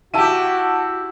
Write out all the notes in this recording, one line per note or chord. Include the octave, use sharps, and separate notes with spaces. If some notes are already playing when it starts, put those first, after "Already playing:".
E4 F#4 G4 A5 E6 D#7